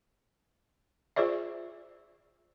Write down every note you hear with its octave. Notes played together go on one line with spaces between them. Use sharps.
F4 G#4 C5 D5 E5